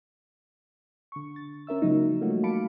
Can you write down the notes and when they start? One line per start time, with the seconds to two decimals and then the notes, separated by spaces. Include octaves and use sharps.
1.12 D3 C#6
1.36 A6
1.67 C#4 A#4 E5 E6
1.82 C#3 F3 F#3 G#3 A#3 D#4
2.21 G3 A3 A#3 C#4 F4 F#4
2.43 F5 A5 B5 D6 C#7 D7